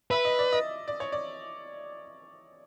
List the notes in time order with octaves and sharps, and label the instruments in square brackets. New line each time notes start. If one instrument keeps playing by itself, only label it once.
[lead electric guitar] B4 [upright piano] E5
[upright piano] D#5
D5
D#5
D5
C#5
D5